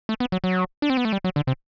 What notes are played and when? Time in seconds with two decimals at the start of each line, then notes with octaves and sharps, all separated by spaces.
0.09 A3
0.20 B3
0.32 F#3
0.44 F#3
0.82 D4
0.90 C4
0.97 B3
1.05 A3
1.13 G3
1.24 F#3
1.36 D3
1.47 C3